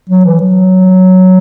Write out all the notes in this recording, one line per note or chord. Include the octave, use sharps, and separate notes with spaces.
F#3
E3
F#3